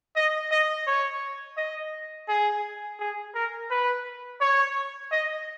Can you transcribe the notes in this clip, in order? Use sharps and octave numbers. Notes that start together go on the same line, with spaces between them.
D#5
D#5
C#5
D#5
G#4
G#4
A#4
B4
C#5
D#5